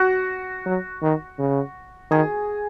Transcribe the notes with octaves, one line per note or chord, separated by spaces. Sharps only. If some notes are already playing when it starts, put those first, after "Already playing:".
Already playing: F#4
F#3
D#3
C#3
D#3 G#4